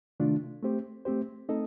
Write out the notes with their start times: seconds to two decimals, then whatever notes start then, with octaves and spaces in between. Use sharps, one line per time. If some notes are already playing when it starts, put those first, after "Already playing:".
0.20 C3 D#3 A3 D4 F4
0.63 A3 C4 G4 C5
1.05 A3 C4 G4 C5
1.49 A3 C4 D#4 A4 D#5